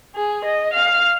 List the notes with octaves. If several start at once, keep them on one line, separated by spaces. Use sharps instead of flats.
G#4
D#5
F5